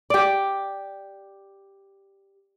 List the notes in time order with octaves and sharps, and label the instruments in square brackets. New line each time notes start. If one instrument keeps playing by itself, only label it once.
[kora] G4 D5